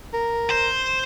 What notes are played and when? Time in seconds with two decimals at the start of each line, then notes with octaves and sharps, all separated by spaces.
0.14 A#4
0.50 C5